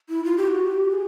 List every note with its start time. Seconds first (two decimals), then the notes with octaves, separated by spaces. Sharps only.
0.10 E4
0.24 F4
0.37 G4
0.47 F#4
0.70 G4
0.92 G#4